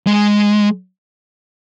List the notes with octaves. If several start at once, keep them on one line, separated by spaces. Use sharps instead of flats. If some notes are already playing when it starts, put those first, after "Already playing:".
G#3